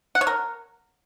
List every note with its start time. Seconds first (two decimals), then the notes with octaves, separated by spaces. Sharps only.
0.15 F#5
0.21 C#5
0.27 A#4